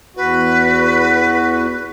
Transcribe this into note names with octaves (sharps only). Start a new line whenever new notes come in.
E2 F#4 B4